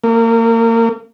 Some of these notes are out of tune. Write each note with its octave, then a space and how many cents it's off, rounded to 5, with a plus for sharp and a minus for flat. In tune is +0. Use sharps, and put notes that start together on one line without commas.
A#3 -30